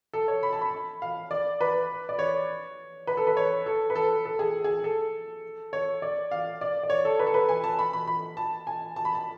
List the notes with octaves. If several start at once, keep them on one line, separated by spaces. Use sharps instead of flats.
A4
C#5
B5
A5
B5
F5
D5
B4
D5
C#5
B4
A4
B4
C#5
A4
B4
A4
A4
G#4
G#4
A4
C#5
D5
F5
D5
D5
C#5
A4
B4
A4
B4
G#5
A5
B5
B5
B5
A5
G#5
A5
B5
A5